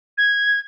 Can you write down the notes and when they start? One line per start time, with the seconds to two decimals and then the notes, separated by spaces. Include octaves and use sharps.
0.18 G#6